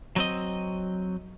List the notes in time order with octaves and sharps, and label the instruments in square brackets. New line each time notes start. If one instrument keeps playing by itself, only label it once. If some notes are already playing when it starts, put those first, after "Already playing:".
[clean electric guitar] F#3 C4 D#5